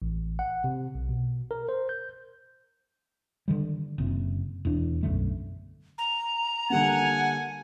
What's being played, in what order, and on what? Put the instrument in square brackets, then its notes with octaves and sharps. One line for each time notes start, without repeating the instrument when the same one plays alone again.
[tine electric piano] A1
F#5
C3
B1
B2
A#4
C5
G6
[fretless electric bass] D3 D#3 G3
F#1 C3
E1 E2 D4
B1 F#2 D3 A3
[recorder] A#5
[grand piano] D3 G3 A#3 [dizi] F#5 [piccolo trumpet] G#5